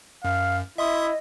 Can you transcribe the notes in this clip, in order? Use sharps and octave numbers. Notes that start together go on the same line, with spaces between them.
F#2 F5
E4 D#5 E5 C6 D#6